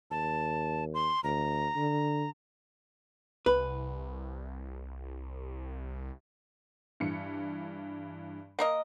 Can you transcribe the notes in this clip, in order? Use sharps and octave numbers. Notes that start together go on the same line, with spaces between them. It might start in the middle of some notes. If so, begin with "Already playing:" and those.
D#2 A5
C6
D2 A#5
D3
C2 B4
G2 E3 C#7
A#3 A#4 D#5